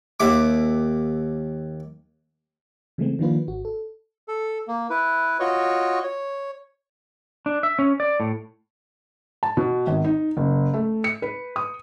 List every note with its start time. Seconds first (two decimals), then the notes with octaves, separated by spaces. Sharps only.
0.20 D#2 E5 D6
2.98 C#3 E3 G#3 A3 C4
3.19 D#3 F3 A#3 D4 F4 B4
3.48 G#1 F#4
3.65 A4
4.28 A4
4.68 A#3
4.90 E4 B4
5.40 F4 F#4 C#5 D#5 C#6
6.03 C#5
7.46 D4
7.63 E5
7.79 C#4
8.00 D5
8.20 A2
9.43 A5
9.57 B2
9.87 G#1
10.04 D#4
10.37 F#1
10.74 A3
11.04 C#7
11.22 B4
11.56 D#6